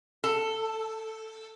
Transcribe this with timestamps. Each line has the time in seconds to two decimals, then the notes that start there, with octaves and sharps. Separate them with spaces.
0.24 A4